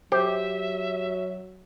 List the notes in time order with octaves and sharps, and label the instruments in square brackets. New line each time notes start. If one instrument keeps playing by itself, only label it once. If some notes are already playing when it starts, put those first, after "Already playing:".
[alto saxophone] F#3 [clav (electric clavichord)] G4 [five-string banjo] C5 [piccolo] E5